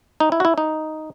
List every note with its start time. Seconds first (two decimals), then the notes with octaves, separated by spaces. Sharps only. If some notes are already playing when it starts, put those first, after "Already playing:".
0.20 D#4
0.32 E4
0.40 F#4
0.45 E4
0.58 D#4